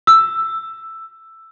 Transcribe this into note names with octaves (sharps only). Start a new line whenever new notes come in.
E6